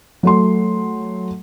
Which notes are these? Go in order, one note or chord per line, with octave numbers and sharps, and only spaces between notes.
F#3 A3 C6